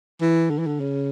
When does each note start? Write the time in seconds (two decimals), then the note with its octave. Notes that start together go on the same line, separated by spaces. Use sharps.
0.22 E3
0.50 D3
0.59 E3
0.67 D3
0.80 C#3